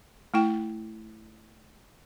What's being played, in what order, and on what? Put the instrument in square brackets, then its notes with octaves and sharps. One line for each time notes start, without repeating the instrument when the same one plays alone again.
[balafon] A3 E4 G5